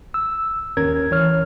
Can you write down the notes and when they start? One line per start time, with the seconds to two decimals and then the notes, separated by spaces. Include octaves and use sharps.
0.14 E6
0.77 D#2 C#4 A#4 G#6
1.10 D2 E3 C#5 F6